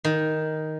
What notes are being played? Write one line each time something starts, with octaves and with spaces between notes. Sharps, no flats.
D#3